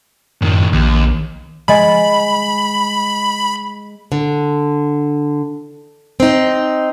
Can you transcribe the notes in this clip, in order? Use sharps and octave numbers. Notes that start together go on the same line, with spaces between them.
F#2 A2 D#3
A#1 D#2
G#3 D#5 G#5 B5
D3
C4 D#4